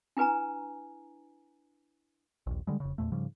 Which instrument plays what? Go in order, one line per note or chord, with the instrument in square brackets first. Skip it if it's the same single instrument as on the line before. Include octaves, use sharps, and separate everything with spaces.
[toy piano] D4 E4 B4 G#5 A#5
[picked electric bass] A#1 D#2
D3 G3 G#3
F1 C#3
E2 G2 A#2 A3
G#2 C#3 F3 G3